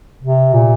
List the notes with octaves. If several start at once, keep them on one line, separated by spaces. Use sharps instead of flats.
C3
A#2